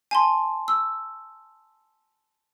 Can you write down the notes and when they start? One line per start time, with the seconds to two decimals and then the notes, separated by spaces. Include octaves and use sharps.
0.11 G#5 A5 C6
0.68 E6